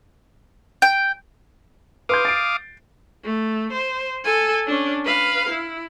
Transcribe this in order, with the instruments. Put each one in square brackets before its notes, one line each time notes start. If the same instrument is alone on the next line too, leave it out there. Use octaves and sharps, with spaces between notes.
[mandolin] G5
[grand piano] B4 C6 G6 [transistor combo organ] F5 D6 D#6
[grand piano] A6 C7 D7
[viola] A3
C5
A4 G#5
C#4 D4
B4 F5
E4